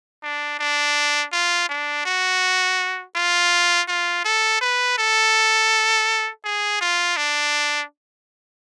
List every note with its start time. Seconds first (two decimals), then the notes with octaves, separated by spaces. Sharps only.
0.23 D4
0.59 D4
1.32 F4
1.69 D4
2.05 F#4
3.16 F4
3.88 F4
4.24 A4
4.61 B4
4.98 A4
6.44 G#4
6.81 F4
7.17 D4